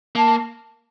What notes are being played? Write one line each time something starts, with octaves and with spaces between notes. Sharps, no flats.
A#3 A5